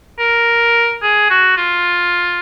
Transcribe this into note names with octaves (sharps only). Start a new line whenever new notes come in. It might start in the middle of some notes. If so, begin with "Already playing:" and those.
A#4
G#4
F#4
F4